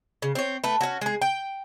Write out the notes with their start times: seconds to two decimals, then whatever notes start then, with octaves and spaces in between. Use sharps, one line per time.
0.22 C#3
0.35 C4 C#5
0.64 A3 B4
0.81 C#4 F#4
1.01 G#3 G#4
1.22 G5